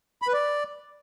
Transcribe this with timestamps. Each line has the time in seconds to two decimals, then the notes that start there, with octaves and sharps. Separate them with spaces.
0.22 B5
0.28 B4
0.33 D5